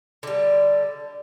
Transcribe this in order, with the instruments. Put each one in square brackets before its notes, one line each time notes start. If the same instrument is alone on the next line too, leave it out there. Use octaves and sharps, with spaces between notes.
[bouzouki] D3 G3